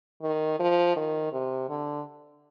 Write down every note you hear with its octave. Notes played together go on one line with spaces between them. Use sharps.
D#3
F3
D#3
C3
D3